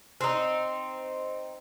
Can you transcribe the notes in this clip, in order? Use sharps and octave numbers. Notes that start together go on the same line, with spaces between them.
C4 D#4